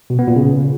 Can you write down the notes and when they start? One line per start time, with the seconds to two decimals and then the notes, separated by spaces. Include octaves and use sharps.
0.10 B2
0.19 B3
0.28 A#2
0.36 C#3